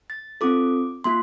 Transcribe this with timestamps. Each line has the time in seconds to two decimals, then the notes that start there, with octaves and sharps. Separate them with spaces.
0.10 A6
0.41 C4 F4 A4 D6
1.04 A#3 F4 C6